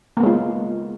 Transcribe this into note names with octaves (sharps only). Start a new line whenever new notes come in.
G#3 A#3 B3 F4